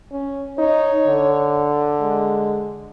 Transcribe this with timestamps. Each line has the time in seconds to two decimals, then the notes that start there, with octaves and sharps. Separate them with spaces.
0.12 C#4
0.58 D#4 C#5
1.07 D3
2.01 G#3